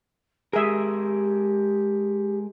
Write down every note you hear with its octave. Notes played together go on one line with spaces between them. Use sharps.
G#3 G4 G#4 A#4 E5